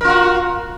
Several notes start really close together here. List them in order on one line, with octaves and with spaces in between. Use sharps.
A#4 F4 F#4